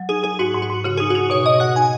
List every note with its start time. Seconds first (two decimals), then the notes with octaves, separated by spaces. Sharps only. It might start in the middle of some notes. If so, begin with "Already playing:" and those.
Already playing: F#3
0.09 D#4 G#4
0.23 D#4 G#4
0.39 G#2 F#4
0.54 G#2
0.62 F#4
0.70 G#2
0.84 C#3 F#4
0.97 D#4 G#4
1.10 F#4
1.15 D#4
1.30 B2 C#5
1.46 B2 D#5
1.60 F#4 F#5
1.75 D#4 G#5